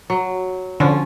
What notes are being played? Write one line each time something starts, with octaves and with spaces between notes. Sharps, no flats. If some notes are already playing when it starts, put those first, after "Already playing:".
F#3
D3 F3 C#4